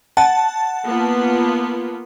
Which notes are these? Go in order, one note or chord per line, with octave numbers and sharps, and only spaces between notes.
F#5 A5
A#3 B3 F4